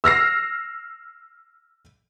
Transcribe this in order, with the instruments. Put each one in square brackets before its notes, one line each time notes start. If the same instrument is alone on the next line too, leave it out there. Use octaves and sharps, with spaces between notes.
[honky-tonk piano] E6 F6 A#6 C7